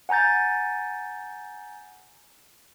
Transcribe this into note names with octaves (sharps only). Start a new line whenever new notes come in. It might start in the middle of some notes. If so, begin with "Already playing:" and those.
F#5 G#5 A#5 G6 A6